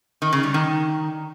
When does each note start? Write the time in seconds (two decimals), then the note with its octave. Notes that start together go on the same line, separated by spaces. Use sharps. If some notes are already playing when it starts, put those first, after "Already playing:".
0.22 D#3
0.33 C#3
0.43 G3
0.54 D#3